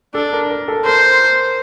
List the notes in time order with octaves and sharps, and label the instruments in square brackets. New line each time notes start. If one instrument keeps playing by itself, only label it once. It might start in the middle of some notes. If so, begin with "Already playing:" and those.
[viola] D4 [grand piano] A4
[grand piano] A#4
A#4
A4
[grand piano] A#4 [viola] C5